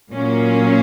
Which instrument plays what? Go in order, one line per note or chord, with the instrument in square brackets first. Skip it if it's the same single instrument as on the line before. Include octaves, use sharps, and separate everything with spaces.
[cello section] A#2 F#3 A#3 C#4